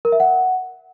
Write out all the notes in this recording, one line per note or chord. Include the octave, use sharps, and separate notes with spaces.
A#4
E5
F#5